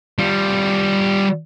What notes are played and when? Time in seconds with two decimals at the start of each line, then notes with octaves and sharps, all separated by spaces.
0.19 G3 F4